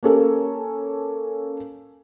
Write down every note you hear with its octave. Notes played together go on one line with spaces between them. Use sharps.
A#3 C#4 A4 A#4